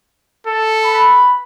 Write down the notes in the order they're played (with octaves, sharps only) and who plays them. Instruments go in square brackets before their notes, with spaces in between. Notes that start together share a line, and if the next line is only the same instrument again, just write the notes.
[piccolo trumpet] A4
[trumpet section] B4 B5